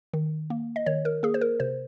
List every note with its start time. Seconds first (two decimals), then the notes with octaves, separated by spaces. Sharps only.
0.13 D#3
0.50 A#3
0.76 D#5
0.86 D#3 C#5
1.05 A#4
1.23 A#3 G#4
1.34 C5
1.41 A#4
1.60 C3 C5